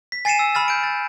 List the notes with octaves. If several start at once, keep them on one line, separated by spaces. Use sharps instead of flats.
B6
G#5 A6 C7 C#7 D#7 E7
E6
B5 F6 A6
G6 D7
A6